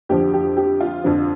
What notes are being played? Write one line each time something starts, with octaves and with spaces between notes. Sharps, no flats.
F2 D3 F3 G4
G4
G4
F4
F2 D3 F3